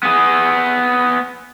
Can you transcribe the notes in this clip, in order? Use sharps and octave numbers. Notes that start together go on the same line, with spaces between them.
B3 G#4